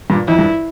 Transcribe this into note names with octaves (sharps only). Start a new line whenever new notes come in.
G2 A#2
F2 E4
G2